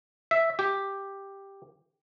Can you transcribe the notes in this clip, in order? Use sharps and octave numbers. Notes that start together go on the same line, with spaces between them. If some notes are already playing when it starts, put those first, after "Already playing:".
E5
G4